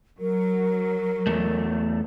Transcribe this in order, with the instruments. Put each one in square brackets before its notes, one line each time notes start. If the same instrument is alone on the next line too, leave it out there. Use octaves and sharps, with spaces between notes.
[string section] F#3 [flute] A#4
[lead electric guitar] E2 A3